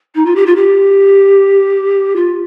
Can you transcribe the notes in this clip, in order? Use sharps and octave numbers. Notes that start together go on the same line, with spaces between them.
D#4
F4
G4
F4
G4
F4